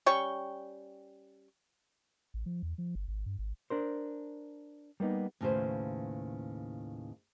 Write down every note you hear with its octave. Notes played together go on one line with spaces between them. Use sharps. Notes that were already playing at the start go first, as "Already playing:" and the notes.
G3 C#4 G5 C#6
A1
F3
E2
F3
G1
G#1
G2
G#1
D4 A#4 C5
G3 A#3 B3 D#4
D#2 A2 C#3 F4 B4 C5